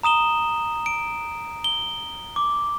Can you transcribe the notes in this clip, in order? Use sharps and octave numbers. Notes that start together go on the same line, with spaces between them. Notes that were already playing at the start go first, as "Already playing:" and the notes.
A#5 D#6 E7 G7
D7
G7
D6